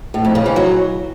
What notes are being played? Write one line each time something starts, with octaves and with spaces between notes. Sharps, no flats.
A2
F2
C#3
E3
F#3